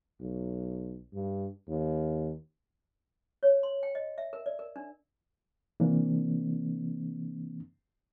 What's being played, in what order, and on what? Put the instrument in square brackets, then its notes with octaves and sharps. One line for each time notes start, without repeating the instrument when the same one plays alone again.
[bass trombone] B1
G2
D#2
[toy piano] C#5
C6
G5
D#5
E5
A#4
D5
A#4
D4
[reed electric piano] C3 E3 A#3 C4 D4